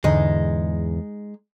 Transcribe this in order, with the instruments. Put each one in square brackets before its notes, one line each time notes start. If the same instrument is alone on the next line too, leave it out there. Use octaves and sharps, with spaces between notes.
[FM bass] E2 [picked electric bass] G#2 D3 [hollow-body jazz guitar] G#3 D#4